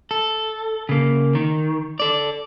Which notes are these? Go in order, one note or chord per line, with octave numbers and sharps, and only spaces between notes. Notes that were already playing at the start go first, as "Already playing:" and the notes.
A4
C#3 A#3
D#3
A4 D5